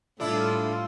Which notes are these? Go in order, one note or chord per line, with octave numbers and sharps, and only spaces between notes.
A2 G3 D4 E4 F4 A4